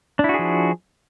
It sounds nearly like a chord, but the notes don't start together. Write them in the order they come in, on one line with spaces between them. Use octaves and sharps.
D4 E4 F#4 G#4 F3